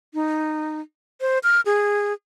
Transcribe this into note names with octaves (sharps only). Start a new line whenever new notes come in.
D#4
C5
F6
G#4